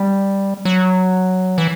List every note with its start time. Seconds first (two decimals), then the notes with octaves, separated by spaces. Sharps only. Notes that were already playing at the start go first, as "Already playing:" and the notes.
Already playing: G3
0.65 F#3
1.58 E3